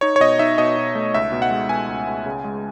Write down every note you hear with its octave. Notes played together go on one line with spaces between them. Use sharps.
D#4 C#5
C#5
B2 D#5
D#4 E5
B2 D#5
B2
A3
C#2 E5
B2
F#5
G#3
B2 G#5
C#2
C#2
C#3
G#3